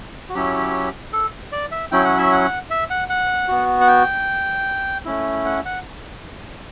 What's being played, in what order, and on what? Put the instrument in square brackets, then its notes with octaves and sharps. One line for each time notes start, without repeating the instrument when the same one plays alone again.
[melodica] F#4
F#3 C#4 E4 G4
A4
D5
E5
F#3 C#4 E4 G5
F#5
E5
F#5
E5
F#5
F#5
B3 F#4
F#5
G5
A3 C#4 E4
F#5
F#5